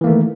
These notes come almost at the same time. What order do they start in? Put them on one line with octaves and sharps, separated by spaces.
E3 A#3 A3 D#3